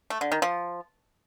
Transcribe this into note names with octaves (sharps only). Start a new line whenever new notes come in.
A3
D3
D#3
F3